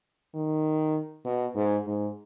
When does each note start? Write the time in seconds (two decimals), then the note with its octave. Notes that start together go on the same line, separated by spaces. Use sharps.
0.35 D#3
1.25 B2
1.56 G#2
1.87 G#2